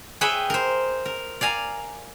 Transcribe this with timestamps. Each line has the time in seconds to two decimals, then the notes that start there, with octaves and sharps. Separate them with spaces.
0.21 G#4 B4 C#5 E5 G5 B5
0.50 A#4 C5
1.05 A#4
1.41 D5 F5 G#5 A#5